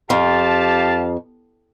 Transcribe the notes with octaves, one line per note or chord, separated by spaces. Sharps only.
F2 G4 F5 A5